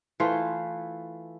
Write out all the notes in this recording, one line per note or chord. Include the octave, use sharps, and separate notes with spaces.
E3 A3 F4 C5